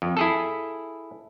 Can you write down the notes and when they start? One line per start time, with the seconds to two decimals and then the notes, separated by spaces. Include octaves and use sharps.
0.02 F2
0.17 E4 G#4 A4